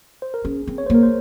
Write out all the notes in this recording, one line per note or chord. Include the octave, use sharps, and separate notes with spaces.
C5
A#4
C#4 G#4
C4
C#5
C5
A#3 A#4
C5